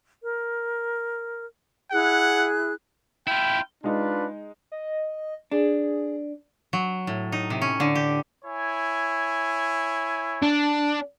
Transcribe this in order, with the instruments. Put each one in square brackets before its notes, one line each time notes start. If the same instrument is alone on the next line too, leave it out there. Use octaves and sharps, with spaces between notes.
[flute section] A#4
[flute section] E4 G#4 F#6 [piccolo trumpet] F#5
[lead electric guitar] E4 F4 [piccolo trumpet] G5
[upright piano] G#3 D#4 [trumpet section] D4 F4 B4
[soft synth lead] D#5
[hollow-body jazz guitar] D4 [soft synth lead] G#4
[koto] F#3
A2
D#4
C3
C#4
D3
G4
[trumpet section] E4 C#5 G#5
[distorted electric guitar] D4